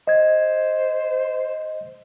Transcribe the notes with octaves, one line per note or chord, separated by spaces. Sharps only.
C5 D#5 G#6